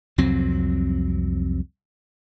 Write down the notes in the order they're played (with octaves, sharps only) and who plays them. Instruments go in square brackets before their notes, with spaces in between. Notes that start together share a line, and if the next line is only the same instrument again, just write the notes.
[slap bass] C2 F2 F#3 C4